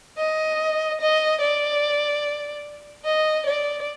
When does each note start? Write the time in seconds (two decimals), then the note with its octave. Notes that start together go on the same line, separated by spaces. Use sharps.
0.18 D#5
1.01 D#5
1.41 D5
3.05 D#5
3.46 D5